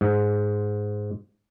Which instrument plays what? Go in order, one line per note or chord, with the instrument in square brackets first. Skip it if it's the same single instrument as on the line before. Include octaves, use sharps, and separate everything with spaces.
[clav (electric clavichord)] G#2